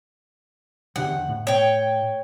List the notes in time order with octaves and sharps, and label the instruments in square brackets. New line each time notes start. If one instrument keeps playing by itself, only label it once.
[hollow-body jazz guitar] E2 D3 G4 [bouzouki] F#5
[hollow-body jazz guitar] A2
[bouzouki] C#5 G5